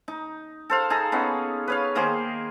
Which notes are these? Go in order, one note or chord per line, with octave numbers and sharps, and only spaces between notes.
D#4
A4 C5 F5
D#4 G#4 A4 A#5
B3 C#4 D#4
B4 C#5 F5
D#3 A#3 G#4 C5